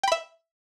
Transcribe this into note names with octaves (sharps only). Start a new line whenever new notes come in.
E5 G5 B5